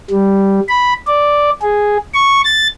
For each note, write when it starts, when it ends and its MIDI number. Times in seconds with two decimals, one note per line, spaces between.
0.11 0.60 55
0.68 0.93 83
1.07 1.50 74
1.61 1.97 68
2.14 2.41 85
2.44 2.68 93